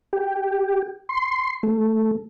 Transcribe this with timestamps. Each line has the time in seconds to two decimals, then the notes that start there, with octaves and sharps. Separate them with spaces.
0.13 G4
1.09 C6
1.63 A3